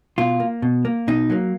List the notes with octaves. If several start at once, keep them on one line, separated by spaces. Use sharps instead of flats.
B2 F4
A#3
B2
A#3
B2 D#4
F#3 A#3